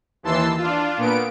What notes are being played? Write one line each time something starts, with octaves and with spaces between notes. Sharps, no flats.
D#2 E3 A5 C6 E6
D4 F4
A#2 B3 D7